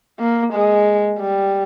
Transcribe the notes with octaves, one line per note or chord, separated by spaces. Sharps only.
A#3
G#3
G3